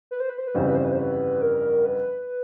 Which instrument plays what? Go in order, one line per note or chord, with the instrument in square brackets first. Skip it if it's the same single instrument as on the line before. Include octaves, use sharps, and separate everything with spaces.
[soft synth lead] B4
C5
B4
C5
B4
[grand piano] G1 F2 C#3 E3 G3 [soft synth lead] C5
[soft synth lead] B4
C5
B4
C5
B4
A#4
B4